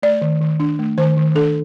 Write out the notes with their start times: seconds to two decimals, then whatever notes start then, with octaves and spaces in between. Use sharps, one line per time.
0.02 A3 D5
0.22 D#3
0.41 D#3
0.60 D4
0.79 A3
0.98 D#3 C5
1.17 D#3
1.35 D4 A4